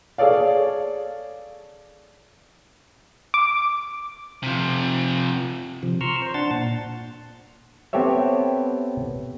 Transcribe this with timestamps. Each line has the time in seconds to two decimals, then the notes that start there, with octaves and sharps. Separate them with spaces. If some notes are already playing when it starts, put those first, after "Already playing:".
0.18 G#4 A4 C#5 D5 F5
3.34 D6
4.43 C3 F3
5.83 C3 F3
6.01 A#5 C6 C#6 E6 F6
6.22 C5
6.34 D4 F#5 A5 C6 A6
6.51 A#2
7.93 B3 C4 G4 A4 C#5 E5